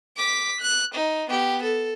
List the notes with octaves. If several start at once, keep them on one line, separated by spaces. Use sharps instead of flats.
D6 B6
F#6
D#4
B3 G4
A4